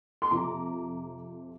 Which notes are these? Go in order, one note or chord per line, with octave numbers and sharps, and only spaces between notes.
C6
F2 C3 F3 A#5 D6